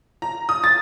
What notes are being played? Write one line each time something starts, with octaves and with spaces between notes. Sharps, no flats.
A#5
D#6
A6